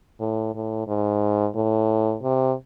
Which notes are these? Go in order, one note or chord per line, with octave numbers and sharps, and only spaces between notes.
A2
A2
G#2
A2
C3